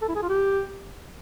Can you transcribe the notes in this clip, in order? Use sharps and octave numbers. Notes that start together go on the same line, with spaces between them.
A4
E4
G#4
F4
G4